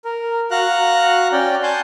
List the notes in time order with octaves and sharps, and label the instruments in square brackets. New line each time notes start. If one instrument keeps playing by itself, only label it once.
[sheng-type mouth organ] A#4
F#4 F5 A#5 F#6
C#4 D5 G5
F#5 G#5 A5 C6 G6